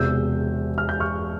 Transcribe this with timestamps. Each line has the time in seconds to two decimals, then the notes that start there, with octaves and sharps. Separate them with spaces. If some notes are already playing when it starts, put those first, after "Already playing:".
Already playing: E1 E2 C3 E6 G6
0.78 F6
0.89 G6
1.00 C#6 F6